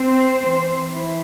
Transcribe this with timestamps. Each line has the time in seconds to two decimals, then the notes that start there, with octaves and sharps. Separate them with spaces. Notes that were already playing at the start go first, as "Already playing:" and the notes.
Already playing: C4 C5
0.42 E3 C4
0.93 E3 E4